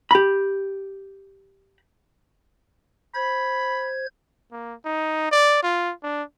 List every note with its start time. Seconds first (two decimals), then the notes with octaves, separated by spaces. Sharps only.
0.11 G4 B5
3.14 C5 B5 G#6
4.52 A#3
4.86 D#4
5.32 D5
5.63 F4
6.03 D4